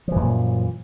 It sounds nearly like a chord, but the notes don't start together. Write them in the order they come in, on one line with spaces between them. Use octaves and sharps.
F3 E3 F#2 A#2